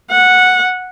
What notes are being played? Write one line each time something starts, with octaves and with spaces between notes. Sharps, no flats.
F#5